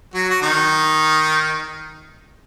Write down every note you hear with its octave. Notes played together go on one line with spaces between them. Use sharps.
F#3 F#4
F#4
D#3 D#4